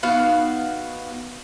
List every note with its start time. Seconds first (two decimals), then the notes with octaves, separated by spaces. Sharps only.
0.03 B3 D#4 F#4 F5